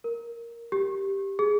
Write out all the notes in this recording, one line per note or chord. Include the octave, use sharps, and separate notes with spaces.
A#4
G4
G#4